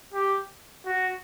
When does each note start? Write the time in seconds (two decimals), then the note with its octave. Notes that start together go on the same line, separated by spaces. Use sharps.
0.14 G4
0.86 F#4